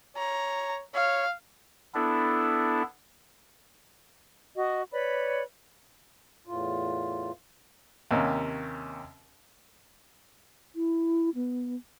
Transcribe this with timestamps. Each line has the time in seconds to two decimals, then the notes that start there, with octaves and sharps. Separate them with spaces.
0.17 C#5 A#5
0.94 C#5 F5
1.94 B3 D4 E4 A4
4.56 F#4 D#5
4.92 B4 C#5 D5 B5
6.47 E2 A2 F4
8.11 D#2 C3 A#3 C#4
10.76 E4
11.35 B3